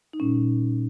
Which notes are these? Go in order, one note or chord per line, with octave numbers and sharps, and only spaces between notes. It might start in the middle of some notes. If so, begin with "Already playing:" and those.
D#4
A#2 G3 C#4